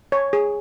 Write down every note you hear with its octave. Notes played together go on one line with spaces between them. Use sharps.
C#5
G#4